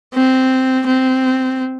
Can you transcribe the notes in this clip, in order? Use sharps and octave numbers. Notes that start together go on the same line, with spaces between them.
C4
C4